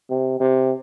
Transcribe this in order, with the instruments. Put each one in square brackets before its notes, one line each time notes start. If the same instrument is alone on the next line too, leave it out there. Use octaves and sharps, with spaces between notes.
[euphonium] C3
C3